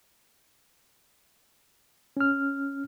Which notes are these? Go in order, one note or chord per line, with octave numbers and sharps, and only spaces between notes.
C#4 F6